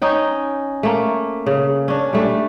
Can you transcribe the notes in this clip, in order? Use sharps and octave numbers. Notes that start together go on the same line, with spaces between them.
C#4 D#4 G5
A3 A#3
C#3
C#4 D4
G3 A3 D4